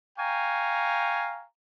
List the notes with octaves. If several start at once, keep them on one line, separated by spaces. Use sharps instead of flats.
F5 G5 G#5 A#5 C#6